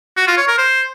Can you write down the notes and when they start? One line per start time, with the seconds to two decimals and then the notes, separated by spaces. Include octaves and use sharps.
0.17 F#4
0.27 F4
0.38 C#5
0.48 A#4
0.58 C5